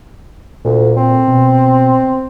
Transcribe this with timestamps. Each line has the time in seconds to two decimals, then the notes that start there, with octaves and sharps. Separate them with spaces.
0.65 D2 A#2
0.97 C4
1.28 B2